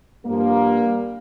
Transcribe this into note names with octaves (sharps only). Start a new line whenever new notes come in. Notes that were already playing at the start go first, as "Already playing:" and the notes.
G2 F3 G3 A#3